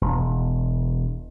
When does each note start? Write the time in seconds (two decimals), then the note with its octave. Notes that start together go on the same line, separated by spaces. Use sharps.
0.01 E1